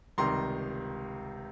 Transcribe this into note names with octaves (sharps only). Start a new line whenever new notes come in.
C#2 C3 D#3 G3 A#5 C6